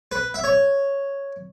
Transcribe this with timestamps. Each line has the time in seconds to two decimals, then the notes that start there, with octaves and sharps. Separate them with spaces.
0.12 B4
0.34 E5
0.44 C#5